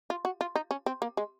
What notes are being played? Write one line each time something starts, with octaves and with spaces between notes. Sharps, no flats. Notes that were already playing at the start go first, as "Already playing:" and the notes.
F4
F#4
F4
D#4
C#4
C4
A#3
G#3